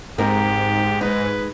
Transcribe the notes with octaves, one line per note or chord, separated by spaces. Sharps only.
G#2 C4 D#4 G4 A#4
G#3 D#4 B4